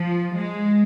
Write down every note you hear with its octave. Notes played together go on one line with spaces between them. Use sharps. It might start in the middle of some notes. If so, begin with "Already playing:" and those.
Already playing: F3
G#3